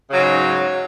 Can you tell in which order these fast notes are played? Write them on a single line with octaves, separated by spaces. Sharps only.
C#3 F#3 G#2